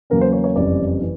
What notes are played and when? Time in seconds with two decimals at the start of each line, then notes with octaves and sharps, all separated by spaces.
0.10 E2 C#3 F#3 A#3 C#4 A#4
0.21 C5
0.32 C#5
0.44 C#5
0.56 F#1 F2 C#3 E3 G3 D5
1.01 E3